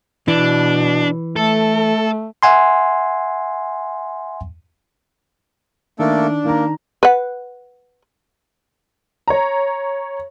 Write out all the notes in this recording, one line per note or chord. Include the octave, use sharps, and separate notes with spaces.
B2 E3 D4
A3 A4
E5 F#5 G#5 C6
D#3 A3 A#3 D4 A4
D#3 A#3 A#5
B4 F#5
C#5 A#5